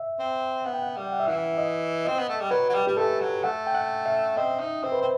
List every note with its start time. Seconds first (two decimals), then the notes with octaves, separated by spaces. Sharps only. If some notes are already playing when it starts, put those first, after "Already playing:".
Already playing: E5
0.19 C4
0.65 B3 F#5
0.73 G5
0.82 F#5
0.97 G3
1.13 F#5
1.20 E5
1.28 E3 F#5
1.58 D#5
2.05 C4 D#5
2.18 B3
2.29 A3
2.40 G3
2.51 F#3 B4
2.69 F#3
2.75 G3
2.87 G3 G4
2.97 A3 A4
3.21 F#3
3.44 A3 F#5
3.67 G5
3.75 F#5
4.06 E5
4.37 C4 D#5
4.60 D#4
4.83 C4 C5
4.92 B4
5.01 C4 C5